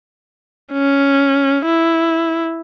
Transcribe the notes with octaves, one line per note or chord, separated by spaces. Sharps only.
C#4
E4